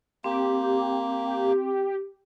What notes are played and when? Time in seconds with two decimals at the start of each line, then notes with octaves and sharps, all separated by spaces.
0.24 A#3 C4 G4